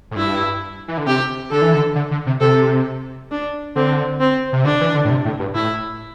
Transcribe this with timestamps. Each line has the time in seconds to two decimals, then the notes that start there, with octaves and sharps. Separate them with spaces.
0.11 A2
0.16 G2 E4
0.88 E3
0.98 D3
1.07 C3 G4
1.51 D3 A4
1.62 E3
1.74 D3
1.95 D3
2.11 D3
2.26 C3
2.41 C3 A4
3.31 D4
3.76 D3 C4
4.20 C4
4.53 C3
4.65 D3 D4
4.81 E3
4.94 D3
5.05 A2
5.10 C3
5.25 A2
5.39 G2
5.55 A2 E4